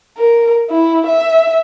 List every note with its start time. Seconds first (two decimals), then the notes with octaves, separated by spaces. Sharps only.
0.17 A#4
0.70 E4
1.07 E5